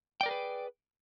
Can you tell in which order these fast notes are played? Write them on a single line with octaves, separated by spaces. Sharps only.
G5 D5 A#4 G#4 B4